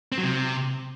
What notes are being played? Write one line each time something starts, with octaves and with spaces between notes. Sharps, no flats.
C4
F#3
C3